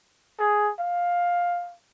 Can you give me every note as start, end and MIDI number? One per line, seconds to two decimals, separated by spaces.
0.40 0.71 68
0.79 1.73 77